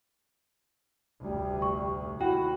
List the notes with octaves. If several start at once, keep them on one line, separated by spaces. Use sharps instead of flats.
F1 D2 A2 G3
C#6
D#2 E4 F#4 G5